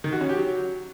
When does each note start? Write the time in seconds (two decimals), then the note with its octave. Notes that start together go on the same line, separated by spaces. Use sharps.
0.04 D#3
0.12 F#4
0.21 C#4
0.29 G4
0.37 F#3